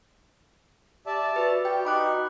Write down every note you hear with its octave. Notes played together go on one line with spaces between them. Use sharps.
G4 D5 E5 A5
F#4 B4
F#4 G4 G5
D#4 B5 D6 F#6